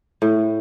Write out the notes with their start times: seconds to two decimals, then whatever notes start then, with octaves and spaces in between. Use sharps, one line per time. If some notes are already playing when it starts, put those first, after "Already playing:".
0.22 A2